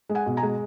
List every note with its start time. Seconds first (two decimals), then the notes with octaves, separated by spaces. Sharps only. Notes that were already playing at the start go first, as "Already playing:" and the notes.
0.09 G#3
0.15 F#5 G#5
0.26 B2
0.37 G#5 A#5
0.43 G#3